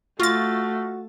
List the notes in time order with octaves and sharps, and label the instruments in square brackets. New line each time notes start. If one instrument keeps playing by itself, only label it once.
[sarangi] A3 [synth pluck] F4 A6 [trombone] F#4 [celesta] C#6 F6 A#6